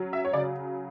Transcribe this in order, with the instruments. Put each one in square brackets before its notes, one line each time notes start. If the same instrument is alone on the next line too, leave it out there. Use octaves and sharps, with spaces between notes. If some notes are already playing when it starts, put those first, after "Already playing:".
Already playing: [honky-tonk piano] F#3 C#4
E5
C#5
C#3 D5